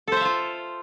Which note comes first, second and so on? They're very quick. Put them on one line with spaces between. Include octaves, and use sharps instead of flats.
A4 C5 E5 F5 F4